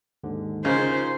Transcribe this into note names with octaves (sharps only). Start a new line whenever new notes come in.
D#2 G#2 D3
C#3 D#4 F4 A#4 C5